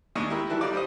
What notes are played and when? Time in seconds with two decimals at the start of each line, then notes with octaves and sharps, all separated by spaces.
0.15 D#2 G#3 D4 D#5 C#6
0.30 E4 G4 A#4
0.50 E3 F#3 G3 E4 A4
0.61 G3 D#4 F4 D5
0.73 G3 C5 D#5